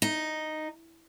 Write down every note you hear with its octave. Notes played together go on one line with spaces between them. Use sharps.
D#4